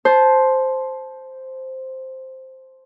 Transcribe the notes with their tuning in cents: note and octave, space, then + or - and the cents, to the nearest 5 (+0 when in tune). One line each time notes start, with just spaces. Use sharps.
C5 +0 A5 -20